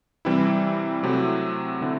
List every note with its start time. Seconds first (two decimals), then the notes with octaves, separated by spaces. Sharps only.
0.25 C3 E3 G3 C4 E4
1.03 C3 F#3 A3 C4 E4
1.81 D3 A3 C4 E4